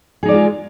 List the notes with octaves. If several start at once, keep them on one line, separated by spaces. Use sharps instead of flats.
G#3 D#4 F4 G#4 D5